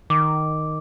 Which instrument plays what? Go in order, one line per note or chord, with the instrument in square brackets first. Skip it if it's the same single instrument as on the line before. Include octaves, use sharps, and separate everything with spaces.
[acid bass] D#3 [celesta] D6